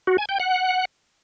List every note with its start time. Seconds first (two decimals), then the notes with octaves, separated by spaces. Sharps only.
0.07 F#4
0.18 G#5
0.29 G5
0.40 F#5